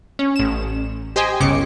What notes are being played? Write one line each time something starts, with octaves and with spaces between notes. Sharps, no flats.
C#4
A1 E7
G4 C5 D#5 G5 G#5
G1 C#2 C#3 D6 C#7